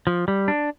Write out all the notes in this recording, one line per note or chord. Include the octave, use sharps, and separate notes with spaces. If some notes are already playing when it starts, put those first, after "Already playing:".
F3
G3
D4